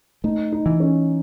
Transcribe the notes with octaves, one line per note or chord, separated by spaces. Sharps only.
A3 D#4
D#4
E3
C#4